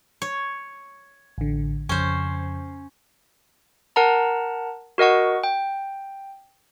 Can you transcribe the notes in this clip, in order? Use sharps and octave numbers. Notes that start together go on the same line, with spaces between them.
C#5
A1 D3
F2 C#3 C#4 C5
A#4 F#5 A5 A#5
F#4 A#4 D#5 F#5 C#6
G5